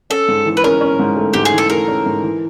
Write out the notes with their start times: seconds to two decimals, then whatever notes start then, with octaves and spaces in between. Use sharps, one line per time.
0.10 C#4 A4
0.28 G#2
0.46 E3
0.57 B4
0.64 C#4 A#4
0.81 C#4
0.99 G#2
1.16 A3
1.33 G#2 G4
1.45 G#4
1.52 E3
1.58 A4
1.70 A3 A#4
1.88 C#4
2.06 G#2
2.23 E3